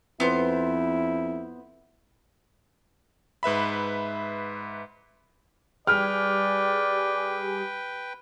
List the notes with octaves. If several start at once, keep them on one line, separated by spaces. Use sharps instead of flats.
F2 B3 E4 C5
G#2 B4 E5 B5
G3 G4 G#4 B4 D5 G5 F6